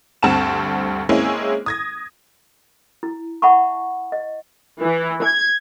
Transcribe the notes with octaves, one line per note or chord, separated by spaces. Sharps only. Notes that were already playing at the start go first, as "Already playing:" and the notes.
D2 G2 C4 F#5 A5 E7
G#3 A#3 C4 C#4 E4 G#4
D#6 G#6 A#6
E4
E5 F#5 A5 B5 C#6
D#5
E3
G#6